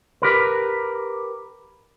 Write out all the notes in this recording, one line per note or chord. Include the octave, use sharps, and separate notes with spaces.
G4 A#4 B4